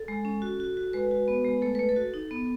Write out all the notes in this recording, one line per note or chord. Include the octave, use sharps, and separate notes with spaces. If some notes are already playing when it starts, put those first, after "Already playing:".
Already playing: A4
G#3
C#4
F#4
F#4
F#4
G#3 B4
F#4
B3
G#3
A3 A4
A3 B4
A4
F#4
D#4
B3